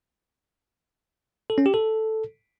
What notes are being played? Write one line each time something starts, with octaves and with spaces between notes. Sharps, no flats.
A4
C#4
G4
A4